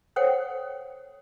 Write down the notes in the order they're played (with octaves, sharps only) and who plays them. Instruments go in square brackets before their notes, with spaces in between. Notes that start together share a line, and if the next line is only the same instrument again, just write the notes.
[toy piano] A4 C5 C#5 F#5 G5